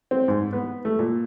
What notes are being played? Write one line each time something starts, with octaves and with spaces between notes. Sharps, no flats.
C4
G#2
B3
A3
A#2